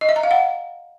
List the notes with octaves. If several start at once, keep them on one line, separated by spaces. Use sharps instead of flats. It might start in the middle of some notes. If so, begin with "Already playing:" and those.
D#5
E5
A#5
F5
F#5